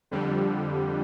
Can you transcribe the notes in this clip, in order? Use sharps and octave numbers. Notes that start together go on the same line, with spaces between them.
F2 D3 G3